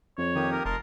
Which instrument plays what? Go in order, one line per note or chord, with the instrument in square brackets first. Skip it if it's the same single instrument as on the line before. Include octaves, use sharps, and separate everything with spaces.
[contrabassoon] F2 [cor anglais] C#5
[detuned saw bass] D#3 [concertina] A#3 G4 D#6
[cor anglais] A#4
[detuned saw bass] F1 [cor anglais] A#4 [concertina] D#5 A5 C6